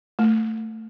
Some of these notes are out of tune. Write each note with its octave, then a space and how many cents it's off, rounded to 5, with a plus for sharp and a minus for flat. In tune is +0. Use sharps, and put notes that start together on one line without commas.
A3 +15